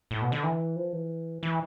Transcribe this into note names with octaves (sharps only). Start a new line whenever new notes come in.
A2
B2
D3
E3
F3
E3
E3